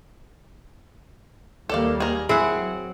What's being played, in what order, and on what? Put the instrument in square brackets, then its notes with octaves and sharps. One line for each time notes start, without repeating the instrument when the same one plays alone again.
[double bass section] D#2 G3 A#3 [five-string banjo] A4 D5 F5
[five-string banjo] G#4 A#4
[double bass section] F#3 [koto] C4 F#5 [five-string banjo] E4 [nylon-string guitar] G#4